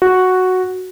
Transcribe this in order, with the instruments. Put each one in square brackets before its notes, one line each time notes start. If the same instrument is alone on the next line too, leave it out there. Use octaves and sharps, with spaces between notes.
[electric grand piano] F#4